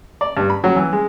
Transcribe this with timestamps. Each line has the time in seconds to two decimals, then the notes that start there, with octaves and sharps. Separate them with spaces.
0.21 D5
0.37 G2
0.50 B5
0.64 F#3
0.76 E3
0.93 G#3